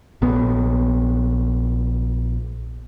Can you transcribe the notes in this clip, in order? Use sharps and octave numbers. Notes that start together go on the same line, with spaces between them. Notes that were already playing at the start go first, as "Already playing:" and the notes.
A#1 B3